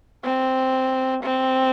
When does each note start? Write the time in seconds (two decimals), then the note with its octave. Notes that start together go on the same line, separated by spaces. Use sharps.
0.24 C4
1.23 C4